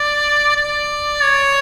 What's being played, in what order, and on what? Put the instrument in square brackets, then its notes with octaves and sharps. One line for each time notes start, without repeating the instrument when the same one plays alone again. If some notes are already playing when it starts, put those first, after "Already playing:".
Already playing: [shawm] D5
D5
C#5